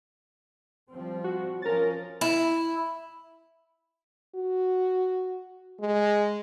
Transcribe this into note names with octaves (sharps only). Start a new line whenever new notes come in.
F3 G3 C4
F#4
F3 C#4 A#4 A6
E4
F#4
G#3